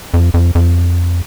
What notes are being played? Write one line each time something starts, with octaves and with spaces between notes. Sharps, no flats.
F2
F2
F2